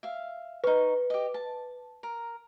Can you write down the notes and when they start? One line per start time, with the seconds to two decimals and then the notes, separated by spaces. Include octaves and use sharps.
0.03 E5 F5
0.64 D#4 B4 C#6
1.10 G4 D#5
1.34 A5
2.03 A#4